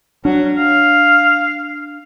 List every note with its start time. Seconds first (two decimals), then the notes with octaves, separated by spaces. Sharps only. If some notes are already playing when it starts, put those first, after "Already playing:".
0.25 F#3 D4
0.59 F5